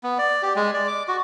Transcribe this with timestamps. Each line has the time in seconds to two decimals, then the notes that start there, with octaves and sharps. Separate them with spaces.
0.03 B3
0.18 D5
0.43 G4
0.56 G#3
0.74 D5
0.87 D6
1.08 F#4